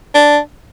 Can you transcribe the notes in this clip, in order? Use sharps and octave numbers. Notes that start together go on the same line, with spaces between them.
D4